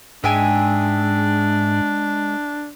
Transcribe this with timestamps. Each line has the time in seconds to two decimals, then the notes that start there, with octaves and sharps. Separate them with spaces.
0.24 G#2 G#3 D4 E5 G5 G#5